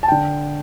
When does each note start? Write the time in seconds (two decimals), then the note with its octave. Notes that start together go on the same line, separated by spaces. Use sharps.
0.03 A5
0.08 D3 G5